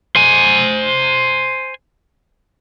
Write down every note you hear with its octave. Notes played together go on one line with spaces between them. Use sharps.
C5 G#5